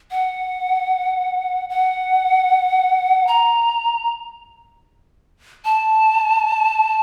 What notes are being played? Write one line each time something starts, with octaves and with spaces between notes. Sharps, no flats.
F#5
F#5
A#5
A5